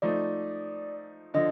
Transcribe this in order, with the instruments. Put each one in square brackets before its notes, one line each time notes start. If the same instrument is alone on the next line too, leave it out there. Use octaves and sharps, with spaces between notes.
[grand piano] F3 A3 D#4 [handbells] D5
[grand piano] D3 F3 [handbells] D#5